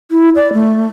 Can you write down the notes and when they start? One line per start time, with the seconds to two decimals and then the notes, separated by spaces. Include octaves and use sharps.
0.11 E4
0.36 D5
0.53 A3